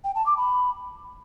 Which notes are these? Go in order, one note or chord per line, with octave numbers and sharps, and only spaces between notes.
G5
A5
D6
B5